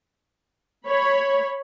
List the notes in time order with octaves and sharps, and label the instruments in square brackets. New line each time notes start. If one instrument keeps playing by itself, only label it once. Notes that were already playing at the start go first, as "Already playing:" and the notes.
[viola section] C#5 B5